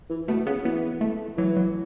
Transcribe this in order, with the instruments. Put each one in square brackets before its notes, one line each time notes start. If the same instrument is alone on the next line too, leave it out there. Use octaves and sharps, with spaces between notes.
[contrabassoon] E3
[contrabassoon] B2 [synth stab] A3
[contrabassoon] C#3 [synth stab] B3
[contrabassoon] E3 [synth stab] B3
[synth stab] A3
[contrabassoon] E3 [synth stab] F#3
[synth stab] F#3